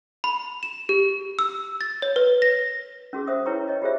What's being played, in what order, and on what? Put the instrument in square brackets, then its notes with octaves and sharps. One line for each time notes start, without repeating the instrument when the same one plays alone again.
[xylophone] B5
E7
G4
E6
A6
C#5
B4
A#6
[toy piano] C#4 F#4 G#4
C5 E5 D#6
E4 B4 C#5 G5 A#5 C#6
C#5 D#5
F4 G4 G#4 C5 E5